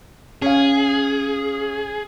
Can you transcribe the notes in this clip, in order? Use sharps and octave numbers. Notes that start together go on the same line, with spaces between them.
C#4 G#4 F5